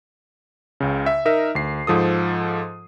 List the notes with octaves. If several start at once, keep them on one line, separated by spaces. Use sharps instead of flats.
C#2 C#3
E5
D#4 A#4 E5
D2 C7
G#2 F3 A4 D#6